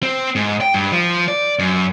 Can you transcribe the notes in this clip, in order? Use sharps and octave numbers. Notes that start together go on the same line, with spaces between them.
C4
G#2
G5
G2
F3
D5
F#2